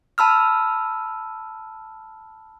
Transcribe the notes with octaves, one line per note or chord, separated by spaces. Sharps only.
A5 B5 E6 F6